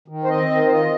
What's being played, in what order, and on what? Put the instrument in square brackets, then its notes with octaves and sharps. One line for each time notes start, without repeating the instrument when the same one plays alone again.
[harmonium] D#3
C5
C4 D#5
D#3
C5
F4 D#5